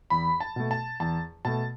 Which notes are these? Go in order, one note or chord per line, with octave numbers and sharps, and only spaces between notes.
E2 B5
A5
B2 A3
A5
E2 A5
B2 A3 A5